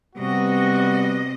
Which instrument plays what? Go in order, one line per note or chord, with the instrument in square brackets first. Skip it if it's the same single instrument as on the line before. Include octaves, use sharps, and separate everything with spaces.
[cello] C3 D#5 [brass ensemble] G3 B3 F#4